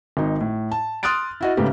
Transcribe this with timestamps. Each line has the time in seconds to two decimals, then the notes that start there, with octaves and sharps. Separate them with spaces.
0.17 G#1 D#4
0.41 A2
0.72 A5
1.03 C6 D#6 F6 F#6 A6 D7
1.41 E4 F#4 D#5
1.57 G#2 C#3 A3 B3 G4